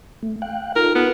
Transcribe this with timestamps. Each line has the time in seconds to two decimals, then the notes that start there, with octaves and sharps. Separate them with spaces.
0.23 A3
0.42 F5 G5 F#6
0.76 D#4 F4 A4 A#4
0.95 B3